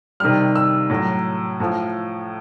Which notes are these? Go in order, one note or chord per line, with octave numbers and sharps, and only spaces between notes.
C3 D#3 G3 F6
E6
A2 F#3
A2 F3